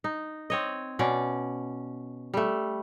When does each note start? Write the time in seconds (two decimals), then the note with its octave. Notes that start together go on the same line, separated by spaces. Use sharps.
0.04 D#4
0.50 C4 C#5 D#5
0.99 B2 C#4 D5
2.34 G3 A3